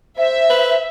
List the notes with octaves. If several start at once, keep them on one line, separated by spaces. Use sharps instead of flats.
C5 E5
B4